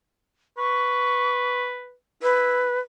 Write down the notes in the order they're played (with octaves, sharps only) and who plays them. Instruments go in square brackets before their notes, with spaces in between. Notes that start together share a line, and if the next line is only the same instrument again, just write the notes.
[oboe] B4 [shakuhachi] C#6
[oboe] E4 [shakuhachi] B4